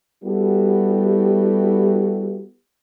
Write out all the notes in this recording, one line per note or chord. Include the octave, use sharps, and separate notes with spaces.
G3 B3 E4 F#4 G4 A4